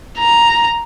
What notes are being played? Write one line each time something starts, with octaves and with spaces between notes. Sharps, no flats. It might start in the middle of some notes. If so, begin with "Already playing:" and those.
A#5